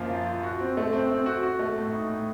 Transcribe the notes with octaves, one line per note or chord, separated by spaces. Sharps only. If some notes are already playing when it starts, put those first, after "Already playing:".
Already playing: F#2 F3 A#3 F4
F4
F4
F#4
C4
A3
C4
C4
F#4
F#4
A3
A2
D#4
A2